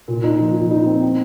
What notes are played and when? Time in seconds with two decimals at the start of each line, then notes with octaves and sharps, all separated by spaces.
0.08 A#2
0.24 D#4
0.40 F3
0.56 F3
0.71 D#4
0.86 C4
1.03 C4